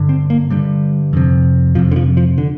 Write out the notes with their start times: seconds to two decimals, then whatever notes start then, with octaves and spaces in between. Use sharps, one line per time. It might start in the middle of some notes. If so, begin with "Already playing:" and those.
Already playing: G2 D3
0.09 C4
0.30 A#3
0.50 G2 D3 G3
1.13 F2 C3
1.75 F2 C3 F3
1.92 D3
1.96 F3
2.17 F3
2.38 D3